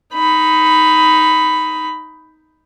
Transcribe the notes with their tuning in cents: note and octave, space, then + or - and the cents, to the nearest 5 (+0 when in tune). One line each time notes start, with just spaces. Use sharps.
D#4 +10 B5 +10